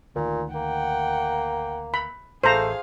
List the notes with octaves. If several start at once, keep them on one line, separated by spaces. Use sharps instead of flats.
D2 A#2 D#3
A#3 F#5 G5
B5
A1 A3 G#4 C5 F5 A#5